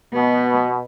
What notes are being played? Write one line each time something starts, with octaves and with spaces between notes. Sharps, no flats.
B2 B3